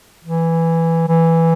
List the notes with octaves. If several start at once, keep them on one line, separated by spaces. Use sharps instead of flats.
E3
E3